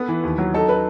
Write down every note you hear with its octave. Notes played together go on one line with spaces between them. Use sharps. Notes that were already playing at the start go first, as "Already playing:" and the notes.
Already playing: B3 A4 B4
E3
D#2
F#3
D#4 A4
D#4 B4